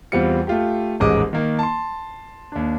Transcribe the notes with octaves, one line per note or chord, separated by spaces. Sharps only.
E2 G3 C4 F4 C#7
A3 F4 G4
D#1 A1 G#2 G#3 D#5 D6
D#3 A#3
A5 C6
D#2 D4